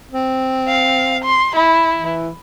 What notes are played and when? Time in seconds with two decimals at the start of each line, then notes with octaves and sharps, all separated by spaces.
0.11 C4
0.68 F5
1.24 C6
1.56 E4 B5
1.96 E3